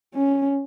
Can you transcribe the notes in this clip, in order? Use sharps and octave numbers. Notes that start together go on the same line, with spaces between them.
C#4